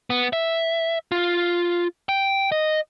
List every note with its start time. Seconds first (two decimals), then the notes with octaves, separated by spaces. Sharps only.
0.10 B3
0.33 E5
1.12 F4
2.09 G5
2.52 D#5